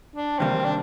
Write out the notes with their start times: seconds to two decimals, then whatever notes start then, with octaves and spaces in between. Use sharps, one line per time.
0.16 D4
0.39 C3 D#3 G3 A#3 C4
0.65 D4